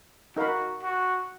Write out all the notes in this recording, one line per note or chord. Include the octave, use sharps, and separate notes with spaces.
D#4 F#4 A#4 F5 B5
F#4